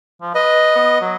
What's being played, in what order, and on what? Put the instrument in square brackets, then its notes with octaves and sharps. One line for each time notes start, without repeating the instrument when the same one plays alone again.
[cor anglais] F3
[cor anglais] B4 [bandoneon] D#5
[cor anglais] B3
F#3